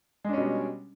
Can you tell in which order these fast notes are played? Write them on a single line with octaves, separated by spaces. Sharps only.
G#3 D4 C#4 B2 G3